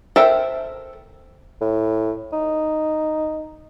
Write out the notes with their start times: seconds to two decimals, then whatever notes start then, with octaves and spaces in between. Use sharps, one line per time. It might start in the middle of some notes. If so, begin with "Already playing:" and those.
0.16 A4 A#4 C5 E5 G5
1.61 A2
2.33 D#4